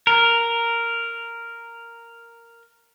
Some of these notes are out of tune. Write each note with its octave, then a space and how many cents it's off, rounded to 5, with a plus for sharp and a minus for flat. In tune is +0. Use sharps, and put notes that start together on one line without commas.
A#4 -5